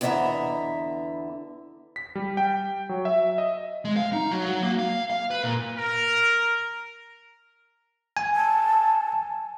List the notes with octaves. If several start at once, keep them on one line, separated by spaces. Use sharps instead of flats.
E2 D3 B3 D#5 E5 A#5
B6
G3
G5
F#3
E5
D#5
G#3
F5
D#4
F#3
F#3
A#3
F5
F5
B4
A#2
A#4
G#5
A5